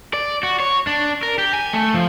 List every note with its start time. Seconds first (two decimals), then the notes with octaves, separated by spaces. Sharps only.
0.13 D5
0.43 F#4
0.60 C#5
0.87 D4
1.23 A#4
1.38 G4
1.53 G#5
1.73 A3
1.94 F3